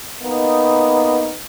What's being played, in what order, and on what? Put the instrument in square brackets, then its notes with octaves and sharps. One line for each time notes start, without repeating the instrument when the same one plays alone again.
[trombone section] A#3 B3 D#4